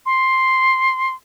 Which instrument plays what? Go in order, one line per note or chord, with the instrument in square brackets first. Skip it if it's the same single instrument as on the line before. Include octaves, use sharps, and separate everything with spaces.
[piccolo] C6